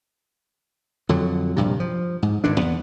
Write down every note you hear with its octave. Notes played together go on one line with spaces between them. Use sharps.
F2 D3 F#3
A#1 G2 C3
F3
G#2
G#1 G2 D3 D4
E2 B3